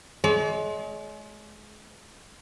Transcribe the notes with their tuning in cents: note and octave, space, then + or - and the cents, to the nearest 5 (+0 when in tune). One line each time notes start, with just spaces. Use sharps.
G#3 +35 D5 -45